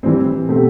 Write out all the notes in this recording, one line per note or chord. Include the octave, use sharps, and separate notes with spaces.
E3 G3 C4
B2 A3 C4 G4